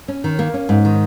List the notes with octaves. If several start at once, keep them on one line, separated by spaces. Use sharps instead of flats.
C#4
D#3
A#3
C#4
G#2
D#3